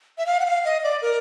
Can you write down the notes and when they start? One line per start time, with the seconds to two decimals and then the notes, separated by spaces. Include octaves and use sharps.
0.18 E5
0.26 F5
0.40 F#5
0.46 F5
0.65 D#5
0.83 D5
1.02 A#4